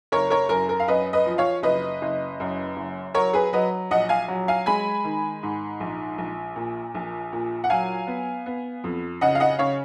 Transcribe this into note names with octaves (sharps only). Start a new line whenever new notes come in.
F#1 A#4 C#5
A#4 C#5
F#2 A#4
A#4
F5
F#2 B4 D#5
B4 D#5
F3
C#5 F5
F#1 B4 D#5
F#1
F#2
F#1
F#3 A#4 C#5
G#4 B4
F#3 B4 D#5
A#1 D#5 F#5
F5 G#5
F#3
F5 G#5
G#3 G#5 B5
D#3
G#2
A#1
A#1
A#2
A#1
A#2
F#5
F#3 F5 G#5
B3
B3
F2
C#3 D#5 F#5
F5
D#5 F#5
C#3 C#5 F5